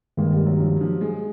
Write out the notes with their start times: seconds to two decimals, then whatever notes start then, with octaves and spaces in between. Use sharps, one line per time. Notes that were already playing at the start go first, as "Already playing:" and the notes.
0.17 G2 D#3 G#3 A#3
0.32 G3
0.46 F#3
0.59 F3
0.81 F3
1.01 G#3